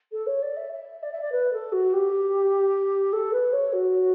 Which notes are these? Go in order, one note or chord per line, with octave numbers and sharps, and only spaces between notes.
A4
C#5
D5
E5
E5
D5
E5
D5
B4
A4
F#4
G4
A4
B4
C#5
F#4